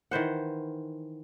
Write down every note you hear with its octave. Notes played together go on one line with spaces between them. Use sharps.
D#3 E3 C5 F#5